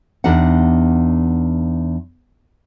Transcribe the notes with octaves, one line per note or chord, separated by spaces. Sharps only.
E2 D4 D#4 G4 F#5